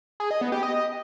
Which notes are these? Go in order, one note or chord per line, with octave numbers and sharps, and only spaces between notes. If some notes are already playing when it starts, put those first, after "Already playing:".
G#4
D#5
B3
G4
D#5